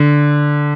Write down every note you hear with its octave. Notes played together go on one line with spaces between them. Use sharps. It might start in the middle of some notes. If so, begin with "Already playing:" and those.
Already playing: D3